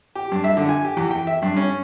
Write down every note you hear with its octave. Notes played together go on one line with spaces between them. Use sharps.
G4
G2
E5
D3
G#5
G4
E2
G5
E5
G2
C#4